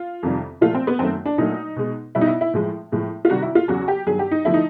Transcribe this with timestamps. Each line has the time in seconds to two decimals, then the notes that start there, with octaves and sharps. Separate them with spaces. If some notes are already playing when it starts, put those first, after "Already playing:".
Already playing: F4
0.23 F2 C3 D#3 G3
0.61 A#2 F3 A3 F4
0.75 C4
0.87 B3
0.99 F#2 D#3 F#3 A3 C4
1.25 D4
1.38 A#2 F#3 A3 D#4
1.76 B2 G#3
2.15 B2 G3 E4
2.21 D#4
2.27 E4
2.41 E4
2.54 A2 F3 G#3
2.92 A2 F3 G#3
3.25 F4
3.30 C3 D#3 G3 F#4
3.42 E4
3.55 F4
3.68 E2 C#3 F#3 F#4
3.88 G4
4.07 G2 D#3 F#3 G#4
4.19 G4
4.31 D#4
4.45 D3 F3 A3 E4
4.54 D#4